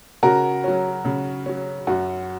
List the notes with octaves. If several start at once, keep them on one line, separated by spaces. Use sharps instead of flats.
C#3 F#4 A#4
F#3 C#4
C#3
F#3 C#4
F#2 F#4